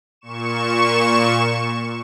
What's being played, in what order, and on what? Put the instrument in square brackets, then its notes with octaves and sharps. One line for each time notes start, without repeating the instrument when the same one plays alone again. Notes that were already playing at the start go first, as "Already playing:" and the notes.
[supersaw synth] A#2 C#6 E7